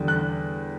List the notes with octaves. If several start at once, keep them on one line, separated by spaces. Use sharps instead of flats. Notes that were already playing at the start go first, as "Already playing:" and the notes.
Already playing: E2 D3 G3
F#6